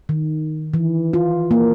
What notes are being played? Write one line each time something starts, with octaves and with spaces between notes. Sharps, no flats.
D#3
E3
F4
A#3